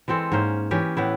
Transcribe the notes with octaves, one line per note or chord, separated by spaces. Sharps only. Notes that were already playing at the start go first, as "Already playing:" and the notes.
E3 G#3 C4 A4
G#2 A#3 C#4 C5
E3 C#4 G4
A2 B3 E4